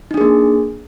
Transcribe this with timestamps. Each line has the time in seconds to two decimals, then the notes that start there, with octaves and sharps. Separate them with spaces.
0.11 D#4
0.14 D4
0.18 G#4
0.21 A#3